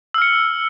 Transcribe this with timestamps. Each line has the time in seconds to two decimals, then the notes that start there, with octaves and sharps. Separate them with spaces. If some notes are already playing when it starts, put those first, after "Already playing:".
0.14 E6
0.18 F6
0.22 C#7